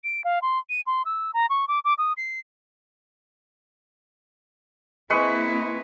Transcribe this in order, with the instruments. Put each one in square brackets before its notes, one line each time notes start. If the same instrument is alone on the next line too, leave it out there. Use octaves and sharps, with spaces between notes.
[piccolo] D7
F5
C6
D#7
C6
E6
A#5
C#6
D6
D6
D#6
C7
[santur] G#3 B4 C#6 [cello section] A#3 C4 E4